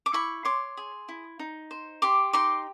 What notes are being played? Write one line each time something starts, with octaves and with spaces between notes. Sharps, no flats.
D6
E4 B5 C#6
C#5 C6 D6
G#4
E4
D#4
C5
G4 C6 D6
D#4 C6 D6